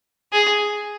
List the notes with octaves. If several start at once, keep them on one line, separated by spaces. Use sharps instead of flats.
G#4